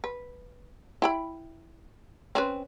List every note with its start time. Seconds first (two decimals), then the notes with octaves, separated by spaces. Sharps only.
0.04 B4
1.02 E4 G5 B5
2.35 C4 C#4 B4